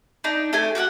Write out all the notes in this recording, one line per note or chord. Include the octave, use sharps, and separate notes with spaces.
D4 D#4
A3 G4 G#5
F#4 G4 F5 F#5